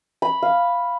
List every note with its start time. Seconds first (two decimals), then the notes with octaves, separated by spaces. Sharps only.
0.22 B5
0.43 F5